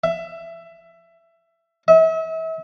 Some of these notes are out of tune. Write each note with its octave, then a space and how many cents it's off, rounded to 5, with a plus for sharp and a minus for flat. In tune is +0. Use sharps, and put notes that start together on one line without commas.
E5 +20
E5 -35